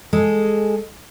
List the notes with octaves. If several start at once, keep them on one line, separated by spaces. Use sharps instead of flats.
G#3 G#4 A4